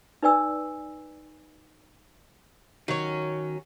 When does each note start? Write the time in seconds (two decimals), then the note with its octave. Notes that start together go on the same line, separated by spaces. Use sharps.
0.23 D#4 B4 D5 G#5 E6
2.88 D#3 F#3 C#4